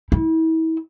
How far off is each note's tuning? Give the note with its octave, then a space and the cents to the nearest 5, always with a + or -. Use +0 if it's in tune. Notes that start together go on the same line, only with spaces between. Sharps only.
E4 -35